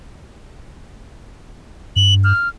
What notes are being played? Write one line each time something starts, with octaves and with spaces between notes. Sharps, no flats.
G2 F#7
F6